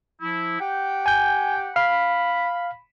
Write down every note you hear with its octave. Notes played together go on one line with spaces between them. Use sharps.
F3 E4
G4 F#5 G5
G#5 G6
F5 B5